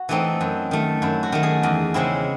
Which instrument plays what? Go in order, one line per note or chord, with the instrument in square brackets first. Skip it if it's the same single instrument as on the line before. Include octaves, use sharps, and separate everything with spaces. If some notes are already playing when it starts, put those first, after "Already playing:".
Already playing: [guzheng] F#4
E3 A3 C4 D#4
F#2
D#3 A3
F#2 E4
F#4
D#3 A3
G#4
E2
C#3 G#3 C4 E4